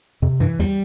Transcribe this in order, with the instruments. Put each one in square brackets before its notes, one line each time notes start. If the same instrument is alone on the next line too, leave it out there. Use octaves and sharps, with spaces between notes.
[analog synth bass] F2 [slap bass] C3
[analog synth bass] G2 [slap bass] E3
[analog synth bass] E2 [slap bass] G3